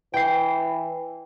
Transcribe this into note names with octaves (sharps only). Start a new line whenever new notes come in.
E3 G5 C7